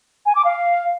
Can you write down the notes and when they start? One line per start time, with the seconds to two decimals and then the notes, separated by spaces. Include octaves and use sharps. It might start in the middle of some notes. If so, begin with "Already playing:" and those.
0.26 G#5
0.35 D6
0.45 F5